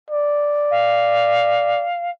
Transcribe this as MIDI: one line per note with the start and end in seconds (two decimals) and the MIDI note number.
0.11 1.88 74
0.70 2.10 77